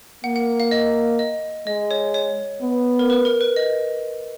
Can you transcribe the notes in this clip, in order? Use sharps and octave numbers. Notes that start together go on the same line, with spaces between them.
A#3 F#5
F#5
F5
D#5
D#5
G#3 D#5
C#5
C#5
B3
A#4
B4
A#4
B4
D#5